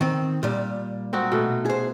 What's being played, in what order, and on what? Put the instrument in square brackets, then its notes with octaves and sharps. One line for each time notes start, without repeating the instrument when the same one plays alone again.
[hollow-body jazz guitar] D#3 C4
A#2 G3
[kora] C4 D#4 F#4
B2 A3
[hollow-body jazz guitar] G#4 C5